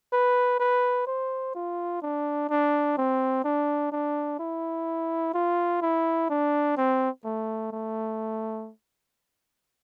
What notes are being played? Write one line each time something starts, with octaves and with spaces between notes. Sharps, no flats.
B4
B4
C5
F4
D4
D4
C4
D4
D4
E4
F4
E4
D4
C4
A3
A3